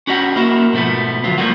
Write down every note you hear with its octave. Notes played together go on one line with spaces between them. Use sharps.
C#4 F#4 G4 D#5 F#5
A#3 E4 F#4 A#4
G#2 B2 F3 A3 B3
D2 F#3 B3 F4
F3 G3 A3 A#3 F4 F#4